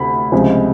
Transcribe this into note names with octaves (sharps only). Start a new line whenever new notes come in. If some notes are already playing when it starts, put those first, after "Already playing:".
Already playing: D2 C3 B5
C#2 C3 F3 G#3